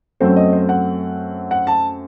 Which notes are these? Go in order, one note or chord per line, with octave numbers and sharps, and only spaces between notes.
F#2 F#3 A3 C4 C5
D#5
C5
F#5
F#5
A5